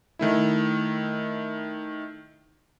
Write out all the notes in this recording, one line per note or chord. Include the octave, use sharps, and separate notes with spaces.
D#3 A3 E4